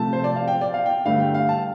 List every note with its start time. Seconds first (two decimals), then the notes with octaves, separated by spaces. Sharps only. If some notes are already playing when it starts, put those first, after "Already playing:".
Already playing: C3 F3 A3 A5
0.13 C5
0.24 D5
0.36 F5
0.48 G5
0.61 D5
0.74 F5
0.86 G5
1.05 G2 D3 A3 F5
1.20 G5
1.34 F5
1.49 A5